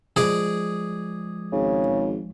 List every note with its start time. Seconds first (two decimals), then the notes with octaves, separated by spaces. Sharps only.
0.16 F3 G#3 G#4 D5
1.52 G#1 C#3